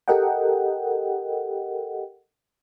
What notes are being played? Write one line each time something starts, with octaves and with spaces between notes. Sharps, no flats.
G4 A4 A#4 D#5 F#5 G5